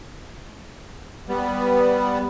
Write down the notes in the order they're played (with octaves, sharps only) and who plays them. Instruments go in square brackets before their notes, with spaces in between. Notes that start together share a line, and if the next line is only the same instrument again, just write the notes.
[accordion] G3 B3